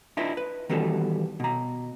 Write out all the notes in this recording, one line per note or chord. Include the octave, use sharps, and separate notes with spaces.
D4 E4 F4 B4 D#5 E5
B4
D#3 E3 G3 B3 F#4 A4
B2 A#5